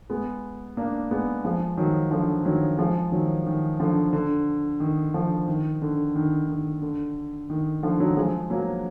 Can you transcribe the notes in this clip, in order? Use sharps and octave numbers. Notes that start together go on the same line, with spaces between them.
G#3 B3
A#3 D4
G#3 B3
F3 G#3
D#3 F#3
D3 F3
D#3 F#3
F3 G#3
D#3 F#3
D#3
D3 F3
D3
D#3
D3 F3
D#3
D3
D#3
D#3
D3
D#3
D3 F3
D#3 F#3
F3 G#3
F#3 A#3